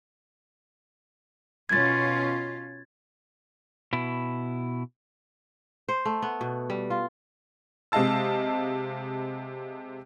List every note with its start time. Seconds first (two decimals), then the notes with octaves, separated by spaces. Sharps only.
1.69 B2 C#4 F4 G#6 A6
3.93 B2 E4
5.89 C5
6.05 A3
6.22 B3
6.41 B2
6.70 G3
6.90 F4
7.92 C3 G#3 D#5 F5 A5 E6